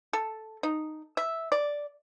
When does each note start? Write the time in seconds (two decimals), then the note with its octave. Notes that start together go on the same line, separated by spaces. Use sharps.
0.13 A4
0.63 D#4
1.17 E5
1.52 D5